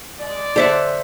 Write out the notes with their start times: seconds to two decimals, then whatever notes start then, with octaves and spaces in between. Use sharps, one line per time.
0.20 G#3 D5
0.56 D3 C5 E5 F#5